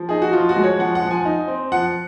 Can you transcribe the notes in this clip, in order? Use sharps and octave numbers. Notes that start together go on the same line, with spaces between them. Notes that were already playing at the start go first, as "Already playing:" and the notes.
Already playing: F3
D#4 G#4
F#4
F3 F4
F#4
G#3
C#5
F3 F#5
F#5
F3
G#5
D#4
C4
F3 F#5